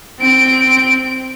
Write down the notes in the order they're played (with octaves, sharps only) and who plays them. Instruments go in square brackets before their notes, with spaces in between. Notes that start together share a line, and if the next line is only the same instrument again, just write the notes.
[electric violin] C4 D7